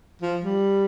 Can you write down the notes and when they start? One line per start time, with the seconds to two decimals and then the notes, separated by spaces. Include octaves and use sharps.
0.22 F3
0.44 G3